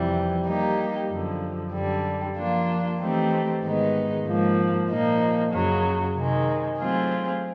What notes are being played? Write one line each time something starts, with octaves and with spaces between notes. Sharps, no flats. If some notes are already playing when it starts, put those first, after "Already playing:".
Already playing: F2 C3 E3 G3
G3 A#3 D#4 G4
F#2 D3 F3
F#2 D3 G3
F3 A#3 D4 F4
E3 A3 C4 D#4 G4
G#2 D#3 G#3 B3 D#4
G#2 F3 A#3
A#2 F3 A#3 D#4
F#2 C#3 F#3
C3 D#3 G#3
F#3 A3 C4 F4 G#4